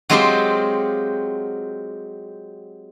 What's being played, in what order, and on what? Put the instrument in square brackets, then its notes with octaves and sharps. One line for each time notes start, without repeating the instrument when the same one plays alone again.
[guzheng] F#3 G#3 C4 F4 G4 C5